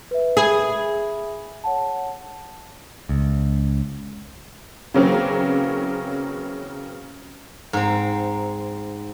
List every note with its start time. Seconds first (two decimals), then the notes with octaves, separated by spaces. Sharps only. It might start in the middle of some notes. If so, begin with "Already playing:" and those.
0.11 B4 E5
0.37 G#4 E5 B5
1.64 C#5 F#5 A5
3.09 C#2
4.94 C#3 E3 F#3 A#3 C4 C#4
7.73 G#2 C4